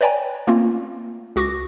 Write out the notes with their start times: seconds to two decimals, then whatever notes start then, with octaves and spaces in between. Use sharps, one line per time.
0.01 B4 C#5 D5 G5 G#5 A#5
0.47 A3 A#3 C4 C#4 F4
1.36 C#2 F#4 C#6 D6 A#6